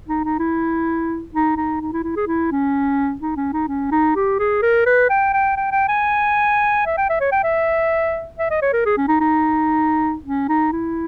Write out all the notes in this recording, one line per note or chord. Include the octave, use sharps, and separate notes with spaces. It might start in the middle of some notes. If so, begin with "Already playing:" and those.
D#4
D#4
E4
D#4
D#4
D#4
E4
E4
G#4
E4
C#4
D#4
C#4
D#4
C#4
D#4
G4
G#4
A#4
B4
G5
G5
G5
G5
G#5
E5
G5
E5
C#5
G5
E5
E5
D#5
C#5
A#4
G#4
C#4
D#4
D#4
C#4
D#4
E4